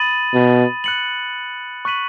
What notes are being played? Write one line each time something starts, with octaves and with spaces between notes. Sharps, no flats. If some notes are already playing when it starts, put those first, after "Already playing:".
Already playing: B5 D#6 A6 D#7 F#7
B2
F#6 C#7 F#7
C#6 F#6 B6 D#7 F#7